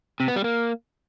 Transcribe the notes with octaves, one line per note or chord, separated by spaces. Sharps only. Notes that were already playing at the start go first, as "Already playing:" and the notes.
C3
B3
G3
A#3